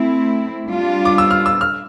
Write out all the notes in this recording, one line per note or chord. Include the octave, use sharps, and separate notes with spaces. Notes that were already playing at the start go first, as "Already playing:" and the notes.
Already playing: A3 C4 E4
G3 D4 F4
D6
E6
F6
E6
F6